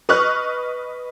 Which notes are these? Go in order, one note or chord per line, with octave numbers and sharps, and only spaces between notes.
B4 D#5 C#6 F6 F#6